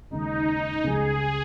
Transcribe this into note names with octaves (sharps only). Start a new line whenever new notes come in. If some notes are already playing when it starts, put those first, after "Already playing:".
D#2 C#3 G#3 D#4
C#2 C#3 G3 G#4